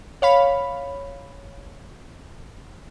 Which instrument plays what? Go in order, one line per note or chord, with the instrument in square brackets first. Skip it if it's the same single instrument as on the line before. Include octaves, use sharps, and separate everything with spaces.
[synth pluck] C#5 F5 B5